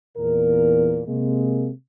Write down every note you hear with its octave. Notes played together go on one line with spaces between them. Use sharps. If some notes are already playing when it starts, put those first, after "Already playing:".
E2 A#2 A#4
C3 G#3 A#3